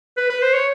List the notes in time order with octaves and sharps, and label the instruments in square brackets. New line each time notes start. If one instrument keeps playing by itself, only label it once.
[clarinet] B4
B4
C5
C#5